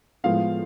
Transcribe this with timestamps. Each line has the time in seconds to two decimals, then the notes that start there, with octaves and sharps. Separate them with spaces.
0.24 A2 F3 G#3 B3 F5